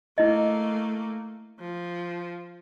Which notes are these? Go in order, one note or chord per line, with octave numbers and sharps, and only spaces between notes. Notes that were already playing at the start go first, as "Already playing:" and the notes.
A3 A#3 E4 D#5
F3